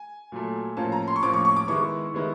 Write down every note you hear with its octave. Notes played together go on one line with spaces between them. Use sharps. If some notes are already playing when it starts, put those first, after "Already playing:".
Already playing: G#5
A#2 F#3 A3
A2 F3 A#3 C#4 F4 A5
A#5
C6
C#6
A2 F3 A#3 C#4 F4 D6
C#6
C#6
D6
D#3 G#3 B3 E4 C#6
D#3 G#3 B3 E4